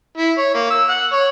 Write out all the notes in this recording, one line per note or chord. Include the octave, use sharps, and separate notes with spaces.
E4
C#5
A#3
E6
F#5
C#5